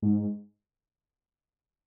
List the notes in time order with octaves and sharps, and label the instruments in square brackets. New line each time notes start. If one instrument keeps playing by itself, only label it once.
[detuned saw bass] G#2